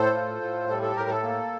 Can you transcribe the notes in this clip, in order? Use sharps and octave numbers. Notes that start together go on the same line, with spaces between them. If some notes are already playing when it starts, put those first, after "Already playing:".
Already playing: A2 A4 C5
F4
A2
G3 A4
A4
A2 G4 A#4
A4
A#3